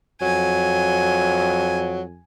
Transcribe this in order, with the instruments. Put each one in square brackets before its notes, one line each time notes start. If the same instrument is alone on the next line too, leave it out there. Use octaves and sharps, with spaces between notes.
[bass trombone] F2 [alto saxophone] F#3 [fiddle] G#5